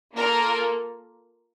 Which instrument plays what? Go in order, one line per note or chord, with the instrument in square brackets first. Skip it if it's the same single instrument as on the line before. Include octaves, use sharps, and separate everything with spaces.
[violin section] A#3 F4 A4 A#4